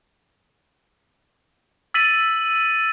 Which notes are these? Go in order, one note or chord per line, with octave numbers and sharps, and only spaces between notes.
E6 A6 B6 D#7 F#7